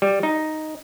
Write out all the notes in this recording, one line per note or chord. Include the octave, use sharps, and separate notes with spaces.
G3
D#4